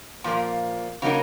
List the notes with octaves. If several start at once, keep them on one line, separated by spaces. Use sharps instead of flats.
A#2 F3 A#3
C#3 F#3 A#3 D#4 A#4